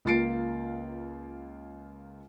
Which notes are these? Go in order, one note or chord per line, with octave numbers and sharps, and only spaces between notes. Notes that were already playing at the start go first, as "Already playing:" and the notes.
C#2 A#3 F4 A6 C7 D7